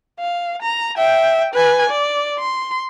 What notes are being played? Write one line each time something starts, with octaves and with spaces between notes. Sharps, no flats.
F5
A#5
E5 G5
B4 G#5
D5
C6